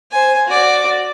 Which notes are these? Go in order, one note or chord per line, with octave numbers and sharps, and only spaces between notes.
C5 G#5
F#4 D5